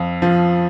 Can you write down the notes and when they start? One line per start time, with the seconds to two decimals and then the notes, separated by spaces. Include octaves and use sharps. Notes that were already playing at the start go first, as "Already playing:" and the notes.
Already playing: F2 F5
0.22 F3